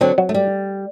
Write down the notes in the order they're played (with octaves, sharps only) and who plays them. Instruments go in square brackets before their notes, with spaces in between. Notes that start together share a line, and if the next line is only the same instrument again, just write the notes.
[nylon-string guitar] D3 F#3 [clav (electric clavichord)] C4
[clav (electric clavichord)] F#3
[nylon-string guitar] A3
G3